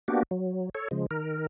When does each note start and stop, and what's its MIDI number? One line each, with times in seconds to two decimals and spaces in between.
0.08 0.23 58
0.08 0.23 59
0.08 0.23 62
0.08 0.23 66
0.08 0.23 67
0.31 0.69 54
0.75 0.88 69
0.75 0.88 73
0.91 1.06 49
0.91 1.06 53
0.91 1.06 56
1.11 1.47 51
1.11 1.47 70